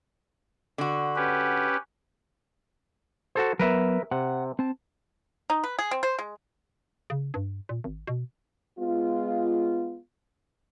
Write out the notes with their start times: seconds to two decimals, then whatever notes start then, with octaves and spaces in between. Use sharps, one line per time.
0.78 D3 F#4
1.16 C#4 G4 B4
3.35 F#4 A4 C5
3.59 F#3 B3 A#4 B4 E5
4.11 C3 F#5
4.59 C4 A5
5.50 D#4
5.64 B4
5.79 G#4
5.91 C4
6.03 C5
6.19 G#3
7.10 C#3
7.34 G2
7.69 A#2
7.84 G#1
8.07 B2
8.79 G#3 B3 F4